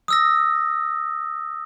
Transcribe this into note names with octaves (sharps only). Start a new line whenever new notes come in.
D#6 E6 A#6